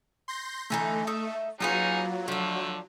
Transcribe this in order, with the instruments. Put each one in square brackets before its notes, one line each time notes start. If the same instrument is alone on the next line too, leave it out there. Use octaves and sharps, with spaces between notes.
[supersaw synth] C6 G6 A#6
[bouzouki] D3 E3 D#4 [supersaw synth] A3
[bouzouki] D#4 E5
[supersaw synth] F#3 [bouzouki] A#3 F4 B4 [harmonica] C#4 D#4 G#4
[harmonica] D3 A3 [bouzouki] F3 D5